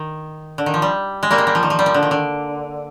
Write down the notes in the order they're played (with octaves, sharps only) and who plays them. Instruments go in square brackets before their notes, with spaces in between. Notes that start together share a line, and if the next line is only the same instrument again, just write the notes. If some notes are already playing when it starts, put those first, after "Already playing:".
Already playing: [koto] D#3
D3
D#3
F3
G3
G#3
G3 A#3
G#3
G3
F3
D#3
F3
G3
F3
D3
D#3
D3